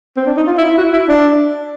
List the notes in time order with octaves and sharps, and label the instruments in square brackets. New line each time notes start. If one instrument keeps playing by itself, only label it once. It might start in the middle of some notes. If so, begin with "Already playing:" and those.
[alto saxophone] C4
D4
D#4
F4
E4
E4
F#4
E4
D4